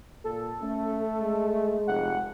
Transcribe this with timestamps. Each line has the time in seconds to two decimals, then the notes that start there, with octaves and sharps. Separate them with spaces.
0.24 A#2 A4
0.62 A3 C#4
1.20 G#3
1.87 F1 F#5